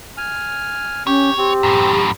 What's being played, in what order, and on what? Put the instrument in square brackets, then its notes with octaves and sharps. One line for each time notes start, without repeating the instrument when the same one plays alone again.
[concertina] G#5 F6
[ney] C#4 [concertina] G4 [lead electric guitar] C#5
[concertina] C4 [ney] G4
[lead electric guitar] F#2 A2